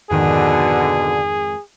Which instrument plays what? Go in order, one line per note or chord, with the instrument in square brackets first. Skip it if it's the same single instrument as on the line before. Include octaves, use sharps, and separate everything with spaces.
[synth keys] F2 G#2 D#3 [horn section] B2 D3 [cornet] G#4